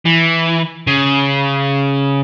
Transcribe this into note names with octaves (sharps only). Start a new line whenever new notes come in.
E3
C#3